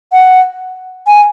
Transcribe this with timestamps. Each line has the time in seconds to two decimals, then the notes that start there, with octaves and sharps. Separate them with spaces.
0.12 F#5
1.07 G#5